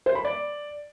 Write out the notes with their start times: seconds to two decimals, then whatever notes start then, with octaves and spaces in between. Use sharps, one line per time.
0.06 C5
0.15 B5
0.25 D5